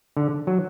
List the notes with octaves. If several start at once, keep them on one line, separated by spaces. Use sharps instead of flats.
D3
F#3